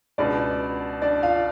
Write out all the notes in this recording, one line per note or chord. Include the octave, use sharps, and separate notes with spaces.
C#2 B2 D4 D5
D4 D5
F4 F5